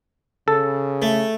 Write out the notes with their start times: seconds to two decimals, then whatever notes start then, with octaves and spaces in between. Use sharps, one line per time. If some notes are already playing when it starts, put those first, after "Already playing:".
0.48 C#3 A4
1.02 A3